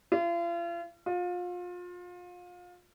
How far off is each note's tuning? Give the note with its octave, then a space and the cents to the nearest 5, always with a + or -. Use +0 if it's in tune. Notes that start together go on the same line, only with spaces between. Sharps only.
F4 -40
F4 +30